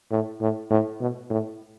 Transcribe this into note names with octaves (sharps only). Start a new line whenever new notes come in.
A2
A2
A2
B2
A2